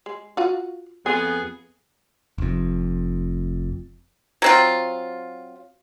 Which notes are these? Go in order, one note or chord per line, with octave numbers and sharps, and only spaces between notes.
G#3
F4 F#4
F2 B3 G#4 G#5
F1 F2
F#3 C4 F4